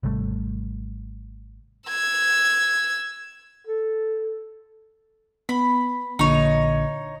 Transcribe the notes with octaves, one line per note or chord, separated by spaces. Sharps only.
G#1 C3 G3 A3
E6 G#6
A4
B3 B5
A#1 A#2 D3 D#4 C#5